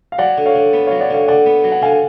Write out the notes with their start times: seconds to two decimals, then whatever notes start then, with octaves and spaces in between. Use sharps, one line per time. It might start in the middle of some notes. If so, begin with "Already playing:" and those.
0.12 F5
0.18 F#3 D5 F#5
0.38 D3
0.46 C#5 F5
0.55 D3
0.73 B3
0.87 F#3 C#5 F5
1.01 D5 F#5
1.10 D3 C#5 F5
1.28 D3 D5 F#5
1.46 B3
1.64 F#3
1.72 F#5
1.82 D3 F5 G#5